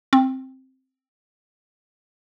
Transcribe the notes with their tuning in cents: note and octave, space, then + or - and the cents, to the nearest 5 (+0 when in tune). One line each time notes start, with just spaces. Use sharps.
C4 +5